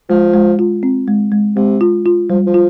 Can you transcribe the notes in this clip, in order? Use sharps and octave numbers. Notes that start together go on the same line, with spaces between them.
F3 G#3
G#3
F4
C4
G#3
G#3
C3 G#3
F4
F4
F3 G3
F3
F4